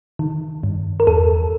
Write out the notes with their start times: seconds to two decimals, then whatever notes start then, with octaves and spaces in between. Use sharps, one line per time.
0.19 D#3
0.63 G2
1.00 A#4
1.07 E2 A4